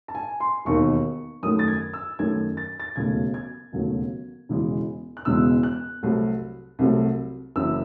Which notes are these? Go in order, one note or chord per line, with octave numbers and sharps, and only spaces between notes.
A5
G#5
C6
E1 D#2 D#3 C#6
F#2 D#3 A3 D#6
A6
G#6
E6
F#2 D#3 A3 G#6
A6
A6
E1 D#2 C#3 F#3 A3 G#6
G#6
E1 D#2 C#3 F#3 A3
E1 E2 C#3 E3 G#3
F#6
E1 E2 C#3 E3 G#3 E6
F#6
C2 C3 F#3 A3
C2 C3 F#3 A3
F#1 F#2 E3 E6